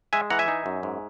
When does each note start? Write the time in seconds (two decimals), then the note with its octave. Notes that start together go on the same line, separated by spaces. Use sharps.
0.13 G#3 E5 G#5
0.30 E3 F#5 A#5
0.39 E5 G#5
0.48 D#4
0.66 F#2
0.83 G#2